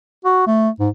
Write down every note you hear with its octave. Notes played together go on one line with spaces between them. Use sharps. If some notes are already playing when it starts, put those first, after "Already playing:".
F#4
A3
G#2